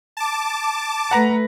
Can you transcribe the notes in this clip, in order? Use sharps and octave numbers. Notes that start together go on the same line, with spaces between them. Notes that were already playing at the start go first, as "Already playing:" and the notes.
A5 D6
A3 B4 F#5 A#5 A#6